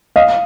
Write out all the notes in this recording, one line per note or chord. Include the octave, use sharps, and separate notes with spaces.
D#5 F5